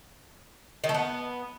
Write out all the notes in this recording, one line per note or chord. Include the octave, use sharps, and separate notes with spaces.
D#3
A3
B3